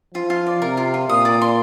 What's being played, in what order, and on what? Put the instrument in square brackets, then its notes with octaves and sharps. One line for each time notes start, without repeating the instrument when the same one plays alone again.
[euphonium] F3 [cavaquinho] F4
[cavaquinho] F4
D5
[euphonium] C3 [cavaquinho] A#4
[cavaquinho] F4
F4
[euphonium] A#2 [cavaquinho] D#6
[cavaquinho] D5
C6